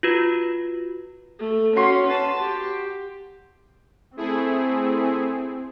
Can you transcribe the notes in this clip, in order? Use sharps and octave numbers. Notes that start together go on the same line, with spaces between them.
F4 F#4 B4
A3
C#4 F#4 C6
B4 A5
G4
A3 C4 E4 G#4